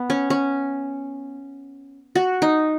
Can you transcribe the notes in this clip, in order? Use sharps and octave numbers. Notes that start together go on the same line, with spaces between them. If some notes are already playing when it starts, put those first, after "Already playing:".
Already playing: B3
C#4
C#4
F#4
D#4